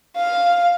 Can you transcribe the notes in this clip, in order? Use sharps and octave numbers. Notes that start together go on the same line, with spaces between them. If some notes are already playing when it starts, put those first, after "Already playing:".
F5